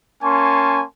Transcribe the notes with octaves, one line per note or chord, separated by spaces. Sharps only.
A#3 C#4 G#5 A5 C6 C#6